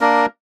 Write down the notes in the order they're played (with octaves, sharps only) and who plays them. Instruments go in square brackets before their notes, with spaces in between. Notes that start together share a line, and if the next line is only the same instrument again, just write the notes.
[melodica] A#3 D4 A#4